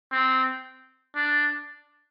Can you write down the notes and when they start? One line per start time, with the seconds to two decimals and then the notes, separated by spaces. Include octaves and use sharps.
0.12 C4
1.16 D4